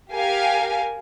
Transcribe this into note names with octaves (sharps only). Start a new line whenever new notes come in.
G4 A#4 F5 G#5